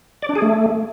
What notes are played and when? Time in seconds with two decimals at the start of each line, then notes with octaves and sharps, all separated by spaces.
0.22 D5
0.29 D4
0.35 G#4
0.42 A3